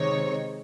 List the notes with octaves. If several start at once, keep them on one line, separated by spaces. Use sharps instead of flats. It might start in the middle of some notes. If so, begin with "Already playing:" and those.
Already playing: C3 D#3 G#3 C4 D#4 C#5